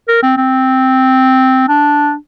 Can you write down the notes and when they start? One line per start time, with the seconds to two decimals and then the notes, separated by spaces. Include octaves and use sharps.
0.08 A#4
0.23 C4
0.37 C4
1.68 D4